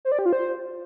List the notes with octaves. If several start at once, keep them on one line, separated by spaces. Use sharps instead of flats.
C5
D5
G4
F4
C5